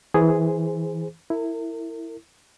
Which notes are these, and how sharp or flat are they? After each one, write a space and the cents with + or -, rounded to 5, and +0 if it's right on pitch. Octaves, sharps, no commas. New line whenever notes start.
E3 -20 G#4 +0 C5 -10
E4 +0 A#4 -40